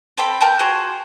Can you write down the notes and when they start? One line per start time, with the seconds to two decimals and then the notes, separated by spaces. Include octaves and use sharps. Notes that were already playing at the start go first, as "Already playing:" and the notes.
0.17 C4 A4 G5 B5
0.41 A#4 G5 A5 G6
0.59 F4 F#4 G#4 C5